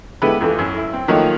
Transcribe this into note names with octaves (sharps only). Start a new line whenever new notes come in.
D3 G#3 B3 E4 G4 B4
F2 E3 A3
F#2
E4
C4
D#3 F3 F#3 A3 A#3 D#4